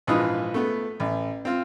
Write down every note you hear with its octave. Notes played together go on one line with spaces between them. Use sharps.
A#1 G#2 E3 F4 B4 D#6
A3 B3
A1
C4 F4